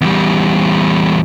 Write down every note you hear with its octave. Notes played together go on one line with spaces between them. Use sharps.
E2 G3